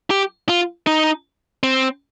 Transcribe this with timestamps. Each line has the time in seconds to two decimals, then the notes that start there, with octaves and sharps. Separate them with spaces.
0.10 G4
0.49 F4
0.87 D#4
1.63 C4